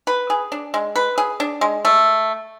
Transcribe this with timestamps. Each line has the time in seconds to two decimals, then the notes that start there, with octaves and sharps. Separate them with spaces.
0.07 B4
0.30 G#4
0.52 D4
0.74 G#3
0.96 B4
1.18 G#4
1.40 D4
1.61 G#3
1.85 A3